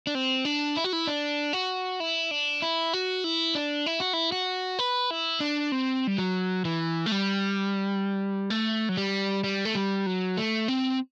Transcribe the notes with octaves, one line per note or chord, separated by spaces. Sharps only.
D4
C4
D4
E4
F#4
E4
D4
F#4
E4
D4
E4
F#4
E4
D4
E4
F#4
E4
F#4
B4
E4
D4
C4
G3
F#3
E3
A3
G3
A3
F#3
G3
G3
A3
G3
F#3
A3
C4